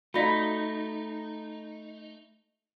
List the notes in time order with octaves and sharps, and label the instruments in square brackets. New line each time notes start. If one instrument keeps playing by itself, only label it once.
[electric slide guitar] A3 D#4 [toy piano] F#4 D5 F5 [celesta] B5 A#6 B6